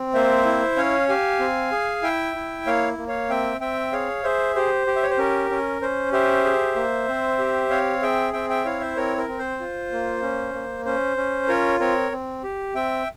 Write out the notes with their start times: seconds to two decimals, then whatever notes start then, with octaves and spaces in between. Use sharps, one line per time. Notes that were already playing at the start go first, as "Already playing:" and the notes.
Already playing: C4
0.14 A#3 C5 E5
0.46 E4
0.77 C#4 C#5 F5
1.09 G4 F5 G#5
1.40 C4
1.72 G#4
2.03 E4 E5 G5
2.36 E4
2.67 A#3 C#5 F5
2.98 A#3
3.08 C#5 F5
3.30 C4 E5 G5
3.60 C4 E5 G5
3.92 G#4 C#5 F5
4.24 G#4 C5 E5
4.55 G4 C5
4.87 G4
4.96 E5
5.03 C#5
5.10 C5
5.18 C#4 A#4
5.50 C#4
5.82 C#4 C5
6.12 G4 C5 E5
6.44 G#4
6.76 A#3
7.08 C4
7.39 G4
7.70 C4 C#5 F5
8.02 G#4 E5 G5
8.33 C4 E5 G5
8.50 E5 G5
8.65 E4 C#5 F5
8.80 C5 E5
8.97 C4 A#4 C#5
9.17 A#4
9.28 C4
9.39 C5
9.60 F4
9.92 A#3
10.22 C#4
10.54 A#3
10.85 C#4 C5
11.17 C#4
11.48 F4 A#4 C#5
11.80 C4 A#4 C#5
12.12 C4
12.44 G4
12.75 C4 E5 G5